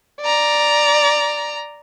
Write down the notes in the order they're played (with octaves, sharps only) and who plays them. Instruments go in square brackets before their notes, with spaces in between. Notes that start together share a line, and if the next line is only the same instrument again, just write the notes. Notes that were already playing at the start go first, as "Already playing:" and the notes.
[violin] D5 A#5